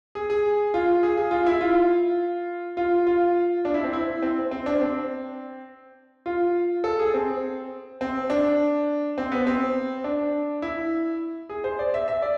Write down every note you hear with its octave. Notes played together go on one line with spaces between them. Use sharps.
G#4
G#4
F4
G#4
G#4
F4
E4
F4
F4
F4
D4
E4
C4
E4
C4
C4
D4
C4
F4
A4
G#4
C4
C4
D4
C4
B3
C4
D4
E4
G#4
C5
D5
E5
E5
D5